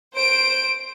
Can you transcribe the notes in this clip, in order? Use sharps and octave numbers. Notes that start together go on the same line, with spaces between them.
C5 D7